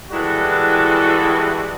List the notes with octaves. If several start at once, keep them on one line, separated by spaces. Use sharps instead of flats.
E3 G3 G#3 E4 F#4 A4